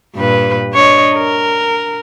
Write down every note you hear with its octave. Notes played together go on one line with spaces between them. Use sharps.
G2 A#2 B4
D4 C#5 D#5
A#4